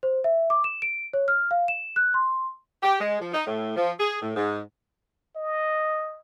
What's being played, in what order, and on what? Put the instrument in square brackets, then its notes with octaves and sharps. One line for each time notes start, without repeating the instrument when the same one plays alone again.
[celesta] C5
E5
D6
E7
D7
C#5
F6
F5
E7
F#6
C6
[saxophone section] G4
G#3
F3
D#4
A2
F3
G#4
A2
G#2
[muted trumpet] D#5